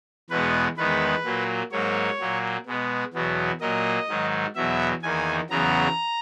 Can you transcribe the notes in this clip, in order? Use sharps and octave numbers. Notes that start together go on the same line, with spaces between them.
E2 B2 G#3 B3 B4
E2 D#3 G#3 B3 B4
A#2 F#3 A#3
G#2 F#3 A#3 C#5
A#2 F#3 A#3
B2 G#3 B3
E2 B2 F#3 B3
A#2 F#3 A#3 D#5
G#2 D#3 F#3
E2 B2 F#3 E5
E2 D#3 A#3 G#5
E2 C#3 F#3 B3 A#5